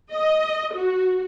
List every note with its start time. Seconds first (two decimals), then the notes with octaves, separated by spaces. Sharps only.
0.13 D#5
0.75 F#4